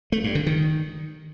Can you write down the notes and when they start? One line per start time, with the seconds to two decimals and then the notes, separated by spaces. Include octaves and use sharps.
0.12 A3
0.24 G2
0.35 D3
0.47 D#3